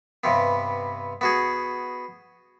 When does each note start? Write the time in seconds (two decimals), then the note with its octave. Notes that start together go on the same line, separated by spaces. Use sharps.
0.24 G2 C3 B3
1.21 B3 F#4 G#4